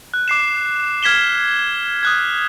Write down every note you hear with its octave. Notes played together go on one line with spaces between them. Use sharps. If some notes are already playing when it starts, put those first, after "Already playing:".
F#6
D6 C7 E7
F6 G#6 B6 E7 G7
D#6 F#6 G#6